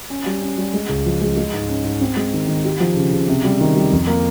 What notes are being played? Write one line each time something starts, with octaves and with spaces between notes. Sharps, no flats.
C#4
G3
C#4
G3
G#3
C#2
F3
G#3
G#3
G#2
C#4
G#2
C4
G#3
D#3
D#3
G4
F3
C#3
C#3
C3
G3
D#3
G3
F2
A#3